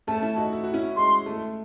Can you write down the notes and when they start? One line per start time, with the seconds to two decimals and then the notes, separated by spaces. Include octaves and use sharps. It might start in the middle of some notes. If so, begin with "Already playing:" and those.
0.07 A3 C#4 A5
0.22 C#4 E4
0.37 D#4 F#4
0.53 E4
0.64 F#4
0.74 C#4 E4
0.96 G#3 C6
1.26 A3